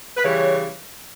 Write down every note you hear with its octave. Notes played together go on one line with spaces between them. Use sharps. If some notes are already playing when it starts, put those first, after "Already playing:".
B4
C#3 E3 G3 C#5